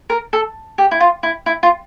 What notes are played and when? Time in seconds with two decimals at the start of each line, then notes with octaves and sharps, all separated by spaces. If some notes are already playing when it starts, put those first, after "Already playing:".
0.10 A#4
0.33 A4
0.78 G4
0.91 E4
1.00 F4
1.23 E4
1.46 E4
1.63 F4